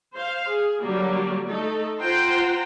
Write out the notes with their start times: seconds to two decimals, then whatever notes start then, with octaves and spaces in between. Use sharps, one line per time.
0.14 C5 F5
0.47 G#4
0.83 D3 F#3 G3 A#3
1.48 A3 D#4 A4
2.00 F4 C5 F#5 G5 A#5 C6